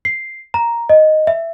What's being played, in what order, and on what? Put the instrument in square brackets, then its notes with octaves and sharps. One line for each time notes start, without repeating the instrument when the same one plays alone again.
[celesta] C7
A#5
D#5
E5